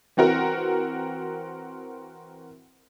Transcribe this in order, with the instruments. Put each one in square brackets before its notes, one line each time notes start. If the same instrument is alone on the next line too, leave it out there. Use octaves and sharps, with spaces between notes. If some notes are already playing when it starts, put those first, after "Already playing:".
[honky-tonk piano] E3 C4 F#4 A#4